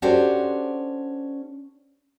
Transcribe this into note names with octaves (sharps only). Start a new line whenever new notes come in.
C#4 D4 F#4 G4 A4 C5